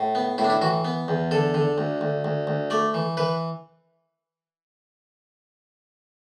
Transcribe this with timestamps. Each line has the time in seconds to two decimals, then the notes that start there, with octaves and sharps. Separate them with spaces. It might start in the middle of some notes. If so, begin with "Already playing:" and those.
Already playing: A2
0.15 B3
0.38 A2 E4
0.44 D4
0.50 E4
0.61 E3 F#4
0.85 B3
1.08 E2
1.31 D3 A4
1.54 D3
1.78 D2
2.01 D2
2.25 D2
2.47 D2
2.70 A3 D5
2.94 E3
3.17 E3 B4